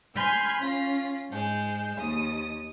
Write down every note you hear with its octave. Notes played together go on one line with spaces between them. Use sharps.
G#5 B5 C6 F6 G6 G#6
C#4 F4
G#2 G#3 G6
D#2 D#6